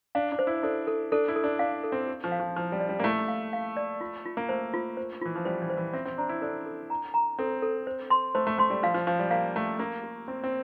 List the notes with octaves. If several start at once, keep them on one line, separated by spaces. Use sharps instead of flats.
D4 F5
D4
C5
E4
D4 A4
A4
D4 A4
E4
A4
D4
D4 F5
A4
C4
G4
F3
F5
F3
F3 E4
G3
D5
G3
A#3
A3 E4
F5
F5
D5
F4
F4
A#3
A3 C5
F4
C5
E3 F4
F3
G3 C5
E3
C5
E3
C4 E5
C4
D4 A#5
E4
D4 A4
A4
A#5
A#5
C4 A4
A4
C5
C6
A3 C5
A3
A3 C6
G3
F3 F5
F3
F3 F5
G3
A#3 F5
A3 F5
A#3 G4
G4
C4 G4
C4